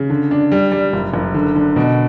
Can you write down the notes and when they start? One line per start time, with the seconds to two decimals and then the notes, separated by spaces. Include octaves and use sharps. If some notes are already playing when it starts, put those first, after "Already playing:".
Already playing: C#3
0.10 D3
0.31 D4
0.52 G3
0.72 G3
0.93 F#1
1.14 F#1
1.34 D3
1.55 D3
1.76 B2